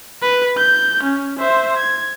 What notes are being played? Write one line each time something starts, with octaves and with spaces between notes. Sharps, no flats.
B4
G6
C#4
C5 E5
G#6